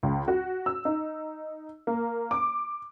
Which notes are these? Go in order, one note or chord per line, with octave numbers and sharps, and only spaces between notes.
C#2
F#4
E6
D#4
A#3
D6